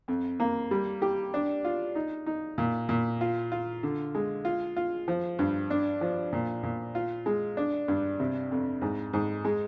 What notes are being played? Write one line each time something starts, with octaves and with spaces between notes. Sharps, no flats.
F2
A#3
G3
G4
D4
F4
D#4
D#4
A#2
A#2
F4
F4
D3
G#3
F4
F4
F3
G2
D4
F3
A#2
A#2
F4
G#3
D4
G2
C3
F2
G#2
G#2
G#3